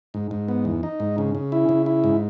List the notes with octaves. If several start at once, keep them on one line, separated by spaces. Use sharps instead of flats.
G#2
G#2
B3
E2
D#4
G#2
C#3
C#3
E4
C#3
E4
G#2